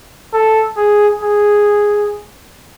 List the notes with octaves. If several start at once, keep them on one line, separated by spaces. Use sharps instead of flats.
A4
G#4
G#4